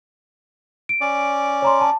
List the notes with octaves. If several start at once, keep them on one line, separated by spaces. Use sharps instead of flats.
D7
C#4 D5
C#5 A#5 C6
A5